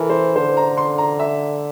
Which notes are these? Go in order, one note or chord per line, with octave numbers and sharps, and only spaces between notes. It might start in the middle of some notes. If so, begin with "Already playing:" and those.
Already playing: E3 A4 A#4
C5
D3 C5
A#5
C6
A#5
E5